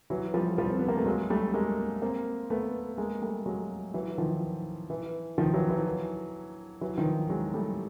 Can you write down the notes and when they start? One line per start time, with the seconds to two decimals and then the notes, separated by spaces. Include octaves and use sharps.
0.10 E3 F#3
0.34 F3 G3
0.58 F3 G3
0.70 C4
0.79 B3
0.88 A#3
0.97 A3
1.06 F#3 G#3
1.30 G3 A3
1.54 G#3 A#3
2.02 A#3 C4
2.50 A3 B3
2.98 G#3 A#3
3.22 G3 A3
3.46 F#3 G#3
3.94 E3 F#3
4.18 D#3 F3
4.90 E3
5.38 D#3 F3
5.54 E3 F#3
5.70 E3 F#3
6.81 E3 F#3
6.98 D#3 F3
7.30 F#3 G#3
7.54 G3 A3